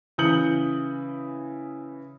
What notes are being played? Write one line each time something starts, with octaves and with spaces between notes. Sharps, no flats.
C#3 E3 D#6 G6 C#7 F#7